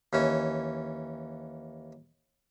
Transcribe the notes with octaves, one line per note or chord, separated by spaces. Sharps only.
D#2 E3 C#4